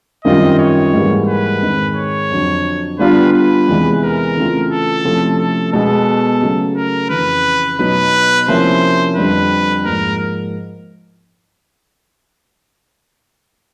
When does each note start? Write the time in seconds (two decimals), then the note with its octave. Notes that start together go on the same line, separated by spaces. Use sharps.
0.25 F#2 D#3 G3 C4 F4 D#5
0.58 C#5
0.94 G#2 E3 G3 A#3
1.27 B4
1.62 G#2 D#3 G#3 C4
1.95 C#5
2.30 F2 D3 F#3
2.99 D3 G3 B3 D4 F4 B4
3.33 B4
3.68 E2 C3 E3 G#3
4.01 A#4
4.36 C#3 E3 A3 C4 F4
4.71 A4
5.05 C3 F3 A3 C#4 E4
5.39 A4
5.73 B2 G#3 B3 A4
6.42 C#3 F#3 A3
6.76 A#4
7.10 F2 C#3 E3 B4
7.79 B2 F#3 B3 D#4 B4
8.48 C3 F3 A#3 C#4 E4 C5
9.16 F2 D3 G3 B4
9.85 G#2 F3 A#3 A#4